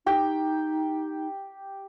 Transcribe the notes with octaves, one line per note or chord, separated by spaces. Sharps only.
D#4 G4 G5